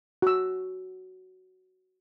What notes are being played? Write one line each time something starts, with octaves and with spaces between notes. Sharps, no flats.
F#4 E6